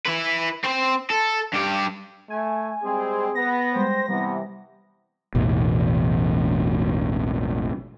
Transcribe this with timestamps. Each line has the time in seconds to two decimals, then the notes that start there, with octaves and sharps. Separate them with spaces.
0.06 E4 B4
0.64 C4 C5
1.10 A4
1.54 G2 G4
2.30 A3 G#5
2.84 G3 G#3 C4 G#4
3.35 B3 A#6
3.74 G3 G#3 C5 G5
4.09 C3 E3 G3 B3
5.35 A1 E2 B2